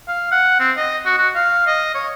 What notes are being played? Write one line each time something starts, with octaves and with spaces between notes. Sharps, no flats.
F5
F#5
C4
D#5
F#4
F#4
F5
D#5
C#5